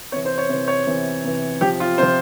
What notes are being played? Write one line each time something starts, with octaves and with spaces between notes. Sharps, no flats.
C3 E3 C#5
C5
C#5
C3 E3 C5
C#5
C3 E3
C3 E3
C3 F3 G4
F4
C3 F3 C5